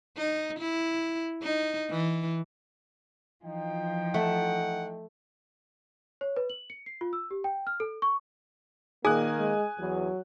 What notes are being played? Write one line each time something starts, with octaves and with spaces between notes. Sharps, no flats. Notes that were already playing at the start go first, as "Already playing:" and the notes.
D#4
E4
D#4
E3
E3 F3 D#4 G5
A3 F#5
C#5
B4
F#7
C#7
C7
F4
E6
G4
G5
F6
A4
C#6
A#2 D#3 A#3 G#4 G#5 D#6 F#6
G#3
E2 F#3